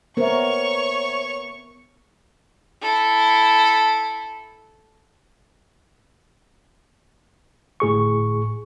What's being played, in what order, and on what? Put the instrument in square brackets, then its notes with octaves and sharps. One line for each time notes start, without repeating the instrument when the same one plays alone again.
[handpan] B3 A#4 [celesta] C5 E5 [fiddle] C#5 C#6
[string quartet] E4 A4
[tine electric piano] G1 A2 G#4 C#6